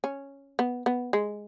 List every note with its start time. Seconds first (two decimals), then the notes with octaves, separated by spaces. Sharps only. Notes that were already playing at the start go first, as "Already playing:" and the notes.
0.04 C#4
0.59 B3
0.86 B3
1.13 G#3